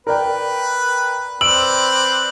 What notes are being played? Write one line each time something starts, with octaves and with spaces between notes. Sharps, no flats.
A#4 B4 D5 G5
C4 B4 D5 E6 D7 F#7